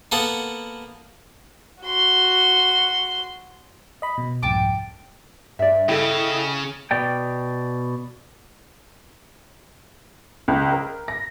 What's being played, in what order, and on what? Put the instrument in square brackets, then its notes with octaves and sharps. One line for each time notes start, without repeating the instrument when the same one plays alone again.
[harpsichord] A#3 B3 A4 F#5
[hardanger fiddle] F#4 C6
[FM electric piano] D#5 B5
B2
[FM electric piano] C2 F2 G#2 [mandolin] G5 A5 D6
[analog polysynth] G2 [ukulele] D5 E5
[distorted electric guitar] C#3 [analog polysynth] E4 D#5 [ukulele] A4 G5
[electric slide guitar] B2 D5 G5
[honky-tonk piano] C#2
A#4
A#6